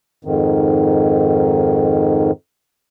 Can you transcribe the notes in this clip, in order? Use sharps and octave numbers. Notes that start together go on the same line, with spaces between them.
F2 G#2 D#3